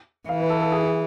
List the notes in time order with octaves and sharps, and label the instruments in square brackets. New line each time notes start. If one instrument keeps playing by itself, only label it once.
[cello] E3 [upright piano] F5
[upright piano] B4
A4
A4
G#4
G#4